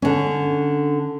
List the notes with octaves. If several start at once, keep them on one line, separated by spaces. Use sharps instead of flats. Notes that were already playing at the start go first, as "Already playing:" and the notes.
D3 C#4